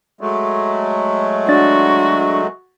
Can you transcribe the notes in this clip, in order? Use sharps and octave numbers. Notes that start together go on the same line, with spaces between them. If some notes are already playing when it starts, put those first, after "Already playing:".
F#3 G#3 A3
D4 F#4 D5 A6